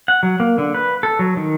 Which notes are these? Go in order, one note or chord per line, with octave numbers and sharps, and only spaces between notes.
F#5
F#3
A#3
D3
B4
A4
F#3
D#3